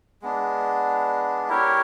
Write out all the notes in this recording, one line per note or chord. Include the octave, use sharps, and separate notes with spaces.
G#3 B3 D4
E4 G4 A#4 C#5